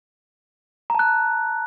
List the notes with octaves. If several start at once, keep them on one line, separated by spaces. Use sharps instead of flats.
A5 A#5 F#6